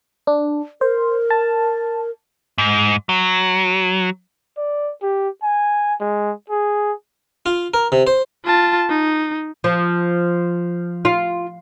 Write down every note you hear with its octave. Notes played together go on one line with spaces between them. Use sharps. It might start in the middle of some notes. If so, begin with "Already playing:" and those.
D4
A#4 C5
A5
G#2
F#3
D5
G4
G#5
G#3
G#4
F4
A#4
C3
C5
F4 A5
D#4
F3
F4